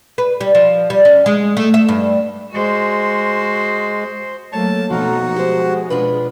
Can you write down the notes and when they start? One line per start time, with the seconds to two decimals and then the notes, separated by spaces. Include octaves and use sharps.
0.18 B4
0.41 G3
0.55 F3
0.90 G3
1.05 C#4
1.26 G#3
1.57 A3
1.74 E5
1.88 G2
2.52 G#3 F#4 C5
4.53 F#3 A3 A#3 C#5 A5
4.90 B2 F3 A3 A#3 D#4 F#4
5.36 G#3 G4 C5
5.90 B2 D4 F4 B4